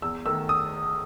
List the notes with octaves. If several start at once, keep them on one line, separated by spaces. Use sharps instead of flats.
E2 E6
D#3 A3 E6
D#6